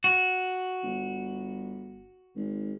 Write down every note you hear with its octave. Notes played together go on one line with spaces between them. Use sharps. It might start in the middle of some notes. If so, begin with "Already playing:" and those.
F#4
G1
G#1